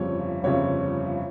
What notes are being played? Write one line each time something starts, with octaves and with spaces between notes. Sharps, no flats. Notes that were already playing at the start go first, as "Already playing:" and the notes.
Already playing: G1 F2 C#3 G3 C#5
G1 F2 C#3 G3 C#5